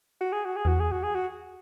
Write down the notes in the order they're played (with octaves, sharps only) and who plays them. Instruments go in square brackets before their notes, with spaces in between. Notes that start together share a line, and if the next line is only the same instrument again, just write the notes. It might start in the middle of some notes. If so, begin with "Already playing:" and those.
[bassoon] F#4
G#4
F#4
G#4
[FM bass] E2 [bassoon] F#4
[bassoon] G#4
F#4
G#4
F#4